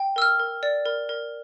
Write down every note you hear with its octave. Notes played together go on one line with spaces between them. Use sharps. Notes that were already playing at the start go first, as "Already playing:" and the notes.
Already playing: G5
A#4 E6
F6
A#4
D5
A#4
A#4